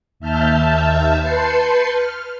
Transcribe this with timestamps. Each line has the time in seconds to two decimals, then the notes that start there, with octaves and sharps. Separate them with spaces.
0.20 D#2 E5 A5 F6 G6
1.18 B4 A5 C6 G6 C7 C#7
1.89 F6